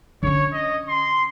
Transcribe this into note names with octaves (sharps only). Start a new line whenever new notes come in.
D3 C#4 C#5
D#5
C6